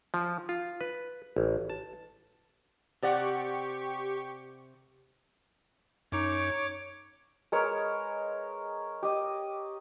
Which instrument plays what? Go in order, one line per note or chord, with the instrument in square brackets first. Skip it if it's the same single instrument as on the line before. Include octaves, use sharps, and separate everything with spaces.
[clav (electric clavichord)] F3
F4
B4
A1
A5
[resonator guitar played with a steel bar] C3 D5 F#5 [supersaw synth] G4 C#6
[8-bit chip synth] F#2 D#4 [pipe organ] C#5 D6
[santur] G#3 A#4 B4 C#5
G4 D#5